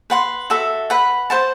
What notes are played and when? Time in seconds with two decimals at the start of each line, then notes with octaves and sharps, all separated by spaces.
0.10 B4 F#5 C6
0.50 F#4 A4 E5
0.90 B4 F#5 B5
1.30 C5 F#5 A5